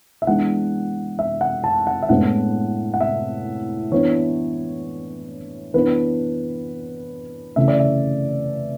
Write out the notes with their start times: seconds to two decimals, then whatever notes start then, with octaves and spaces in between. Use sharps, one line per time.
0.22 E5
0.27 E3 G#3 B3 D4 F#5
1.19 E5
1.41 F#5
1.64 A5
1.87 F#5
2.02 E5
2.09 A2 G#3 B3 D4 F#5
2.94 F#5
3.01 E5
3.92 E3 B3 D4 C#5
5.74 E3 B3 D4 B4
7.56 C#3 E3 A3 C#4 E5
7.68 D5
7.79 E5